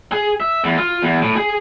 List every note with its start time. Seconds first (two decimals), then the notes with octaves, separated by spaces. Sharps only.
0.12 G#4
0.40 E5
0.64 E2
0.78 F4
1.02 E2
1.22 A2
1.36 G#4